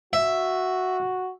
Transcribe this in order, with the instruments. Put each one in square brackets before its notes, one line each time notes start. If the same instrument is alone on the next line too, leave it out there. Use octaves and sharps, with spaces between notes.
[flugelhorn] F#4 [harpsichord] E5